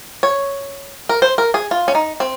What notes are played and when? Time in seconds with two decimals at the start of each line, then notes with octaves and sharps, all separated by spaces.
0.23 C#5
1.09 A#4
1.22 C5
1.38 A#4
1.54 G#4
1.71 F4
1.88 C#4
1.95 D#4
2.20 C4